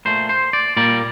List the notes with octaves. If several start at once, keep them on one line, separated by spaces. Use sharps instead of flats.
A#2 A3 C5
C5
D5
A#2 G3 A#3 D5